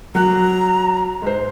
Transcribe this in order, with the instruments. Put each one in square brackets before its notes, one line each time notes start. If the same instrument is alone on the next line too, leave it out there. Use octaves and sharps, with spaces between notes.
[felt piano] F#3 F#6 [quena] A#5
[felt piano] G#2 C5